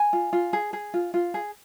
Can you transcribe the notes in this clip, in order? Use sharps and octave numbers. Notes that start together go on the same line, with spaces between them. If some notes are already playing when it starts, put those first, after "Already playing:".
Already playing: G#5
F4
F4
G#4
G#4
F4
F4
G#4